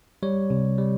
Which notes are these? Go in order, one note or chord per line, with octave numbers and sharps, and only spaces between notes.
G3 C#5
C3
G3